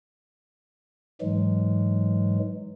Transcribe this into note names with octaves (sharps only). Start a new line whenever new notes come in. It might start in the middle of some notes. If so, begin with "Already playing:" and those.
G#2 E3 F#3 G#3